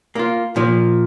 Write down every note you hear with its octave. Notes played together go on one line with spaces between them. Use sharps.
A#3 F4
A#2 F3